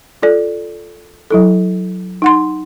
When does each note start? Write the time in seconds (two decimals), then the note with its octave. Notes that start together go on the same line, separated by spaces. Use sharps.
0.22 F4 A4 D5
1.31 F#3 E4 A4
2.22 D#4 F#5 C6